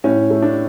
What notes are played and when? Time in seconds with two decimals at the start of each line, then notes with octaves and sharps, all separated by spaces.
0.04 A2 C#4
0.30 A3
0.42 D4